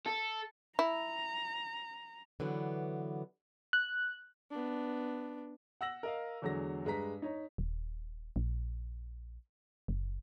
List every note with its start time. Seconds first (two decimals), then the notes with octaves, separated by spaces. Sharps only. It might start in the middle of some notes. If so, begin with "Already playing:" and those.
0.07 A4
0.79 E4 A#5
2.40 D3 E3 F#3 B3
3.73 F#6
4.51 B3 D4
5.81 F#5 E6 A#6 F#7
6.03 A#4 D#5 F5
6.42 E2 D3 F#3 G#3 A#6
6.85 G2 G#3 B4 A#5 B6
7.22 D#4 C#5 A#5
7.58 D#1
8.36 A#1
9.88 F#1